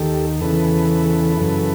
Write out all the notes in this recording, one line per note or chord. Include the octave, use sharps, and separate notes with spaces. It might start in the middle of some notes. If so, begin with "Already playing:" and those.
Already playing: D#2 D#3 G4 A4
E2 C#3 E3 A4 B4
F#2 C#3 E3